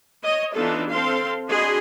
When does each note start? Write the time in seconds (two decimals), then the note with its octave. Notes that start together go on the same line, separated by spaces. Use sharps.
0.23 C#5 D#5
0.54 E3 B3 D4 D#4 F4 A4
0.91 C4 A4 F5 C6
1.49 D4 F#4 G#4 D#5 B5 C6